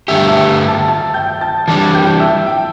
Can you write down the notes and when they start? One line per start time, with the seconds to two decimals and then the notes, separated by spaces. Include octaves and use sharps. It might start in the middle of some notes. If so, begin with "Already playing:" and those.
0.08 G2 D3 A3 G4 E5 E6
0.28 E5 E6
0.68 A5 A6
0.88 A5 A6
1.14 G5 G6
1.41 A5 A6
1.67 E3 G3 D4 A5 A6
1.94 G5 G6
2.20 E5 E6
2.46 G5